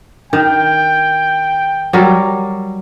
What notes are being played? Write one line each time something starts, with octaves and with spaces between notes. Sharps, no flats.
D#3 G5
F#3 G3 A#4